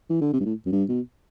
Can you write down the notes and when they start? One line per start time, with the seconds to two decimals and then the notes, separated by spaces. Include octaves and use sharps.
0.10 E3
0.21 D3
0.33 C3
0.40 G2
0.45 A2
0.66 F#2
0.72 G2
0.89 B2